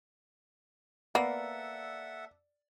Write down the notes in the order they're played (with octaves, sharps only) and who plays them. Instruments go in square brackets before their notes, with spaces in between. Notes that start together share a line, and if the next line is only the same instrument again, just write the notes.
[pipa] A#3 [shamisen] B3 [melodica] A4 E5 F#5 [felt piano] D5